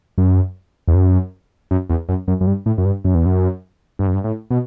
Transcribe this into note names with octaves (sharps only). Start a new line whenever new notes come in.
F#2
E2
F#2
F#2
E2
F#2
F#2
F#2
G2
A2
F#2
G2
F#2
E2
F#2
G2
F#2
G2
A2
B2